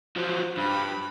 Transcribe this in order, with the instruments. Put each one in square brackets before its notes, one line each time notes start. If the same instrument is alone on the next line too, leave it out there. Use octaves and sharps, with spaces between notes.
[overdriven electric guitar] F3 F#3 [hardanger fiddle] C5
[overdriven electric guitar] G2 [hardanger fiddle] B5